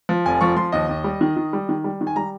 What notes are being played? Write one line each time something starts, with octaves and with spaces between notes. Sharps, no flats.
F3
F1 G#5
F3 C#6
F3 C6
D#2 D#5
D#2
G3
D#3
D#3
G3
D#3
G3
D#3
G#5
G3 A#5